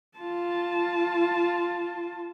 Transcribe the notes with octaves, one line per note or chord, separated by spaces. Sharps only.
F4 A5